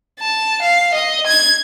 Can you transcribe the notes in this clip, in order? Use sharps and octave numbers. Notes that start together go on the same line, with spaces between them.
A5
F5
D#5
G#6